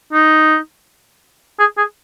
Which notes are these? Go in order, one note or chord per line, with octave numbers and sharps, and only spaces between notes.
D#4
G#4
G#4